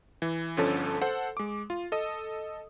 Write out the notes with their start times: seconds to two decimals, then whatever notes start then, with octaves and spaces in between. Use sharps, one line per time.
0.22 E3
0.57 G1 D3 F3 C#4 A4 A5
1.01 A4 C5 F#5
1.37 G#3 D6
1.70 F4
1.92 A4 D#5 D#6